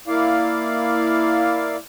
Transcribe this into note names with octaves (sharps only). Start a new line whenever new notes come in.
A#3 E4 D5 F5